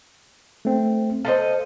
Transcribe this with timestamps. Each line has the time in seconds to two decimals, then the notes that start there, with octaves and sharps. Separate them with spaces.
0.65 A3 C4
1.25 A4 B4 C5 D#5 F5